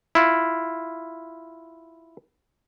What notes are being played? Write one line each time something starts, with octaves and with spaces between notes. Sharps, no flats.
E4 F4